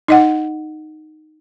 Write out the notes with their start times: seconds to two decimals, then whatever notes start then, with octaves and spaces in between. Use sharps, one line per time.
0.08 D#4 D#5 F#5